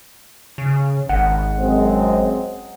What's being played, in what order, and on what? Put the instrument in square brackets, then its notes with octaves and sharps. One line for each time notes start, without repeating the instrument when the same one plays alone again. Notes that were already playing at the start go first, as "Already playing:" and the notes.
[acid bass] C#3
[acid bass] G#1 [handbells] F#5
[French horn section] F#2 G#3 C4